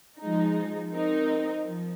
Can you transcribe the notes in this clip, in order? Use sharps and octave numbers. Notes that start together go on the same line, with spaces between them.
F3 G#3 D#4
C4 D#4 A#4
F3